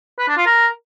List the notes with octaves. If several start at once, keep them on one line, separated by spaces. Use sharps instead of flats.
B4
D4
F4
A#4